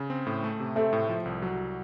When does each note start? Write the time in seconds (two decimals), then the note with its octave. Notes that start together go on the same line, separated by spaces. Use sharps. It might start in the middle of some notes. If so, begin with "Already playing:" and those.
Already playing: C#3
0.10 C4
0.26 A2
0.44 A3
0.60 C3
0.76 A3 C4
0.93 A2
1.09 F3
1.25 C2
1.42 F#3